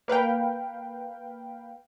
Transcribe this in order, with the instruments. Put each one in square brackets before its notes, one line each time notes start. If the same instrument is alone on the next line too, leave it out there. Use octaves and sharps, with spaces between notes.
[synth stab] A#3 B4 F5 G5